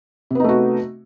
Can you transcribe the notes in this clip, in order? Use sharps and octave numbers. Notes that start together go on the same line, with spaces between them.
C3 A3 B3 D#4 F#4